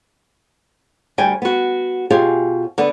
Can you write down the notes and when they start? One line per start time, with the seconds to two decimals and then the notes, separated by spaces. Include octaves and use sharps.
1.18 D2 G3 C#5 G5 G#5
1.42 B3 F#4
2.10 B2 F4 G4 G#4 C#5 G#5
2.78 D3 B3